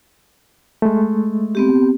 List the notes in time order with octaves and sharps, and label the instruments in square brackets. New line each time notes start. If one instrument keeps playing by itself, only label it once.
[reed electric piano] G#3 A3
[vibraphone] B3 C4 G4